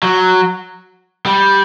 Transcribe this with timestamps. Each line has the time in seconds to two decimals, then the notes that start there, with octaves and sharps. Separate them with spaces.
0.03 F#3
1.26 G3